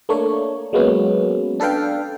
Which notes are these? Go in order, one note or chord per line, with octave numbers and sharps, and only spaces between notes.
A3 A#3 D4 C#5
F#3 G#3 A#3 B3 C#4
D4 A4 B4 F5 G5